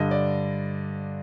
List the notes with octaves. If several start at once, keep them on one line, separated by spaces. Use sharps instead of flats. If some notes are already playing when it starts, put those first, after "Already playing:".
Already playing: G2 D3 D#5
D5